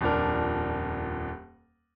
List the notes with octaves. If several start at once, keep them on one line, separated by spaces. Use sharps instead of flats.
D#1 F2 D4 A#4